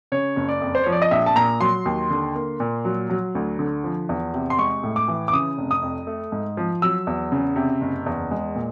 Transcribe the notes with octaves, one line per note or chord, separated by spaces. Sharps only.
C#3 C#5
F#1
D5
F2
C5
F3 C#5
D5
D#5
A#1 E5
A5
A#2 A#5
F#3 C6
D#2
D3
A#3
A#2
F#3
F#3
D2
D3
F3
E2
C3
C6
G#3 C#6
A2
D6
E3
D6
C#3 D#6
F1
D#6
F2
A3
G#2
F3
F#3 E6
E2
C#3
C3
F#1
E2
G#3
A#2